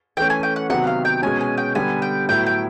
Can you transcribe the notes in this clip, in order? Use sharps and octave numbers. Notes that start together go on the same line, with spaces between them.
E3 A3 C#4 G5
G#5
G5
F#5
C3 D#3 F#3 B3 F#5
F5
G5
B2 G#3 C#4 G#5
G#5
G5
D3 G3 B3 G#5
G5
A2 F#3 B3 E4 G5
G5